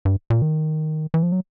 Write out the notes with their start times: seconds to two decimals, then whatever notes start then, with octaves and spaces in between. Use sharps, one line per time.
0.05 G2
0.30 A#2
0.42 D#3
1.14 E3
1.23 F3
1.32 F#3